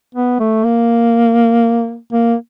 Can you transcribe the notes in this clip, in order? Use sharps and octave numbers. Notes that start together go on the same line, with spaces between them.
B3
A3
A#3
A#3